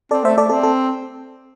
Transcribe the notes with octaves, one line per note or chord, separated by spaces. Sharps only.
C4 A4 D5
A3 C5 E5
A3 A4 D5
C4 A4
A4